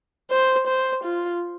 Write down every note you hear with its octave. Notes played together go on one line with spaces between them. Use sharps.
C5
C5
F4